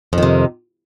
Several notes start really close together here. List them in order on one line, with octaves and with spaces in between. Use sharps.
F2 D#3 C3